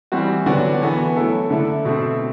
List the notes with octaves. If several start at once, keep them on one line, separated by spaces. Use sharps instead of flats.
E3 G3 C4 F#4
D3 F#3 B3 D4 F#4
E3 B3 F#4 A4
F#3 A3 E4 A4
D3 A3 E4 A4
B2 A3 C4